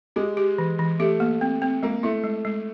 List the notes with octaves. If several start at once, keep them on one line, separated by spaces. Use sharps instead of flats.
G#3 G4
G4
E3
E3
A3 G4
A#3
C4
C4
G#3 A#3
A3 E4
G#3
G#3